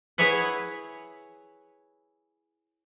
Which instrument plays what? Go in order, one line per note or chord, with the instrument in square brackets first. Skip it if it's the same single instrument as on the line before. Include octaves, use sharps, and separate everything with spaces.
[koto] E4 G#4 B4 C#5 E5 F#5